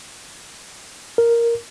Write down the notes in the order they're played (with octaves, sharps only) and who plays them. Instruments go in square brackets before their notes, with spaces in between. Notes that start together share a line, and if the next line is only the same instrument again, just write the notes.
[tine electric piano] A#4